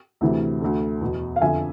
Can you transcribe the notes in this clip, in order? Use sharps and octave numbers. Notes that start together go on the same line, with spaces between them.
D2 C3 E3
D2 D3
E2 B2
F5
F2 D3 E5 G#5